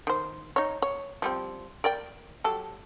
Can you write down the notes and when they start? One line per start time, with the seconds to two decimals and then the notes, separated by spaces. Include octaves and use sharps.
0.07 D#3 C5
0.56 D#4 C#5
0.82 C#5
1.22 F3 G3 C4
1.84 A#4 D5 G5
2.44 F#3 G4 A4